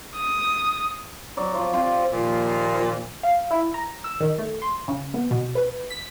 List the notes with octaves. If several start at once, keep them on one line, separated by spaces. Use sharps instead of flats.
D#6
F#3 D5
F3 F4
C4 F4 G4
D#2 A#2 F3
F5
E4
A#5
E6
D#3
A3
C6
C#3
B3
B2
B4
B6